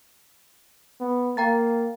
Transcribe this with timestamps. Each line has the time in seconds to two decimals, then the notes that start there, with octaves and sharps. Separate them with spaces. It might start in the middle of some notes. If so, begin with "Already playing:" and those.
1.01 B3
1.37 A#3 G5 A#5 A6